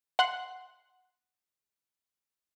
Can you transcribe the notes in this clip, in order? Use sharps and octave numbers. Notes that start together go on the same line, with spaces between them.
F#5 C6 F#6